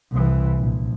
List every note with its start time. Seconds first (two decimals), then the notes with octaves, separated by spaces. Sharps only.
0.11 C2 E3
0.59 A#1